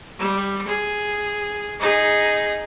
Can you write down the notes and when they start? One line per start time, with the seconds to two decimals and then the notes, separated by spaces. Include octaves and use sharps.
0.19 G3
0.68 G#4
1.80 D#4 G#4